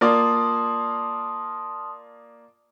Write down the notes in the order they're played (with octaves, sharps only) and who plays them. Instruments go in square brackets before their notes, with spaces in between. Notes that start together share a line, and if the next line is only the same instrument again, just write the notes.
[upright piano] A#3 F4 D5 [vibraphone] A5 C6 D#6